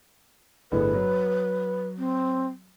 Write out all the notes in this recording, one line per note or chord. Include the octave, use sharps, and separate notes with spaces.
G1 A2 G#4 B4
F#3
C4